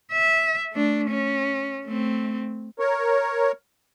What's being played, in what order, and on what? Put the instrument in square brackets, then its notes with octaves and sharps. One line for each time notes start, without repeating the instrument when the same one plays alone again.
[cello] E5
A3 D4
C#4
A3 C4
[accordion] A#4 C#5